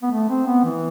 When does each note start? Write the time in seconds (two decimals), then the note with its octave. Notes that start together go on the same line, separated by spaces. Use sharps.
0.03 B3
0.12 A3
0.29 C4
0.47 B3
0.64 E3